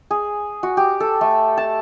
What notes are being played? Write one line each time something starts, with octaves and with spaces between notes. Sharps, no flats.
G#4
F#4
G4
A4
A3
A5